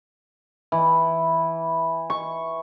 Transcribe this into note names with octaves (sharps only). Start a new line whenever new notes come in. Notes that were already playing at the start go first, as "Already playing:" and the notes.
E3
C#6